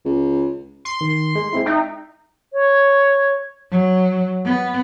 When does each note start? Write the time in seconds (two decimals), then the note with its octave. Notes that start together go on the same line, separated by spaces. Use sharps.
0.05 C#2
0.85 C6
1.01 D#3
1.35 G#3
1.53 G#3 C4 E4
1.66 D#4 E5 G5
2.53 C#5
3.71 F#3
4.45 B3